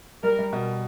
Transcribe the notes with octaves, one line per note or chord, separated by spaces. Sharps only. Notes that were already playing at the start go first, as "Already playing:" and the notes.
G3 A#4
G3
B2